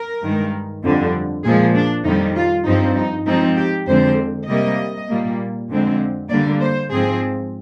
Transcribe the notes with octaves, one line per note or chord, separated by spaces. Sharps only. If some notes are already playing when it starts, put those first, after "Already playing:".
Already playing: A#4
G2 D#3 G#3
F2 D3 G3
A#2 F3 G#3 G#4
D4
F2 D#3 G3 D#4
F4
G2 F3 C4 D#4
D#4
G#2 F3 C4 D#4
G4
F2 D3 G#3 C4 C5
C3 G3 A#3 D#5
A#2 G3 A#3
F2 D3 G#3 C4
D3 G3 A#3 D5
C5
G#2 F3 C4 G#4